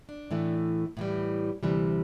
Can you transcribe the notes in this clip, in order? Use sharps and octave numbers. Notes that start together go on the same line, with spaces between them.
D4
A2 E3 A3
A2 E3 G3
D2 C3 E3 G3